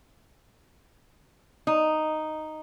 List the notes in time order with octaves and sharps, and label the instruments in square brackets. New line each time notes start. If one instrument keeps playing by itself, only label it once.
[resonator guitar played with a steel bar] D#4